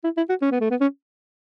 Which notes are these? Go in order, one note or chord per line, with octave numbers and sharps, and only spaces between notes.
E4
E4
F#4
C#4
B3
A3
B3
C#4